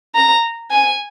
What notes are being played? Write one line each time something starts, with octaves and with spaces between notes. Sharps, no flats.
A#5
G#5